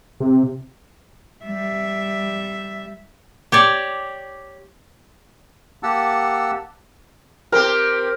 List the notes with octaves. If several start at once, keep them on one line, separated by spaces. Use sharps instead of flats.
C3
G3 E5
G4 C#5 D5
A#3 G4 F#5 A5 E6
C4 G4 A#4